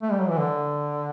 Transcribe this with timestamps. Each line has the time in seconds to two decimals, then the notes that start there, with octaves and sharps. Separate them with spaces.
0.02 A3
0.11 G3
0.20 F#3
0.29 E3
0.38 D3